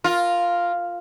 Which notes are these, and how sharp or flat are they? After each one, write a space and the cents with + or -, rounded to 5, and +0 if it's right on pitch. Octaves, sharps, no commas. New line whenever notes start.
F4 +0 A#4 +0